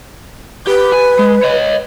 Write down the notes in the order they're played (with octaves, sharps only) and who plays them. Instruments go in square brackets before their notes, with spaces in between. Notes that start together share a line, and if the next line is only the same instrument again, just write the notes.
[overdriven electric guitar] G4 [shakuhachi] B4
[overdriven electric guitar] G#5
G#3
C#5 D#5